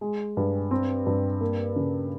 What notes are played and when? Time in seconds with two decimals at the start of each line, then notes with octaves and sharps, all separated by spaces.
0.01 G#3
0.37 G2
0.71 C4
1.06 G2
1.41 A#3
1.76 C#3